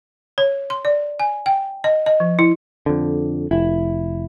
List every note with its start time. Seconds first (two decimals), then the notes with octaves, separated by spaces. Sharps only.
0.38 C#5
0.70 C6
0.85 D5
1.20 G#5
1.46 G5
1.84 D#5
2.06 D#5
2.20 F3
2.39 E4
2.86 F2 D3
3.51 F1 E4